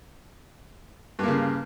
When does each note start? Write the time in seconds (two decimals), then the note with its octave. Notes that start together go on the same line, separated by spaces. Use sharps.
1.19 G2
1.23 A#3
1.28 C#3